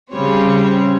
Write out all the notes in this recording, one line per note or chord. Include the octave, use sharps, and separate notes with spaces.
C#3 G3 C4 C#5